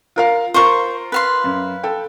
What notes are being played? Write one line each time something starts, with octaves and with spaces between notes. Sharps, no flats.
F4 A#4 F5
F4 A#4 C5 C#6
B4 F5 C6
F#2
A4 G5